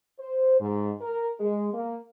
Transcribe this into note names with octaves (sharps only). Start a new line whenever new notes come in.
C5
G#2
A#4
G#3
A#3